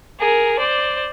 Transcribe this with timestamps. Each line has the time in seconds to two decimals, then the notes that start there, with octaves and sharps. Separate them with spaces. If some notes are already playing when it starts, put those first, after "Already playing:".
0.19 G#4 A#4
0.58 C5 D5